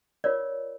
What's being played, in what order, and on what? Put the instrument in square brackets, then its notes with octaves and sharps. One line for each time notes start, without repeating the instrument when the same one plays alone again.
[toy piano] F4 A#4 C#5 D5